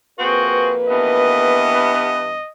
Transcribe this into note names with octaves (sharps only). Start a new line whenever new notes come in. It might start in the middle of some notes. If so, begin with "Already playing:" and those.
F2 A#3 C4 F#4 G#4 B4
G2 E3 B3 D#5